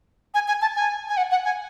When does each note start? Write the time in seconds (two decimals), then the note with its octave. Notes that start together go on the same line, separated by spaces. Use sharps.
0.34 G#5
0.48 G#5
0.61 A5
0.76 G#5
1.09 G#5
1.17 F#5
1.31 F#5
1.44 G#5